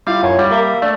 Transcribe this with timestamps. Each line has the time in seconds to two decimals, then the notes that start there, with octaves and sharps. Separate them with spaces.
0.07 G3 E4 F4 F5
0.23 F#2 C#5
0.39 G3
0.51 A#3 E5
0.82 A3 D4 D5